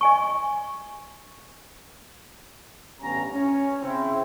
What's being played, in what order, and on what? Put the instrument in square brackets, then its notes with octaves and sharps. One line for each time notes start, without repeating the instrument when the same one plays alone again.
[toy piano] D#5 G#5 C#6
[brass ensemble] A1 G2 B3 C#4 A#5
C#4
C#3 C4 E4